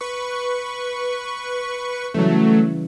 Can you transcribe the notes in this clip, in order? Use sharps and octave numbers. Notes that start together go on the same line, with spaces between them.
B4 C#6
C#3 E3 F#3 G3 A3